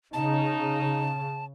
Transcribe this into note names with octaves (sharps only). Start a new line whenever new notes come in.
C#3 D#4 A5